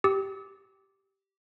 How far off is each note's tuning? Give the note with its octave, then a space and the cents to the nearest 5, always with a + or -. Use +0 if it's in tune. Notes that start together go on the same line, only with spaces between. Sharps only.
G4 -10 E6 -45